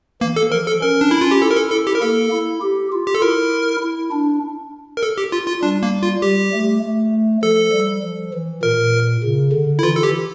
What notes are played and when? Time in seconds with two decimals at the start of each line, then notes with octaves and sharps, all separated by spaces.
0.21 E3 A#3
0.36 A4
0.52 F3 A#4
0.66 A4
0.81 C#4 A#4
1.01 D4
1.11 C#4 E4
1.21 F4
1.31 G4
1.41 E4 A4
1.51 A#4
1.56 A4
1.71 E4 A4
1.87 G4
1.95 A#4
2.02 A#3 A4
2.32 E4
2.61 G4
2.92 F4
3.07 G4
3.15 A4
3.22 E4 A#4
3.82 E4
4.12 D4
4.97 A#4
5.03 A4
5.18 G4
5.32 F4
5.48 F4
5.62 G3 D4
5.83 A#3
6.03 F4
6.22 G3 G4
6.53 A3
6.83 A3
7.43 F3 A4
7.73 G3
8.03 F3
8.33 E3
8.63 A#2 A#4
9.24 C#3
9.53 D3
9.79 E4
9.83 E3 F4
9.96 A4
10.03 G4